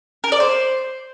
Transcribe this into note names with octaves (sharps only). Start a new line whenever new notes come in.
A#4
D5
C5